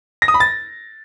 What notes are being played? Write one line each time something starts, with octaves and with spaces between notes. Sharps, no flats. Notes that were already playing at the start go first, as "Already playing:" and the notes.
A#6
D#6
B5
A6